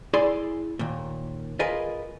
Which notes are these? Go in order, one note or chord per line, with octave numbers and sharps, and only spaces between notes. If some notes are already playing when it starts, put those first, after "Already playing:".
E4 G#4 D5 B5 C6
D#2 A#2
F4 G#4 A#4 B4 D#5